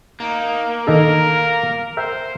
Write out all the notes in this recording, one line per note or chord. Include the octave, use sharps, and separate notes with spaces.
A#3 D#4
D#3 D#4 A4 A#4
A#4 C5 E5 G5